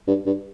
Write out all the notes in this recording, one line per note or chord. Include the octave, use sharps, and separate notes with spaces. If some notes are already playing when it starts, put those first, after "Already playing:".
G2
G2